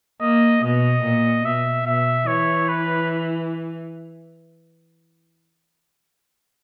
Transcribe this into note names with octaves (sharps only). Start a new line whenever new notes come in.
A#3 D#5
B2 D#5
A#2
B2 E5
B2 E5
E3 C#5
B4